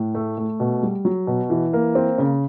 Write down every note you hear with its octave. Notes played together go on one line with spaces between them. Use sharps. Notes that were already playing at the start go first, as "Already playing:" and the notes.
Already playing: A2
A3
A3
B2
G3
F#3
B2
E3
A#3
C4
C#3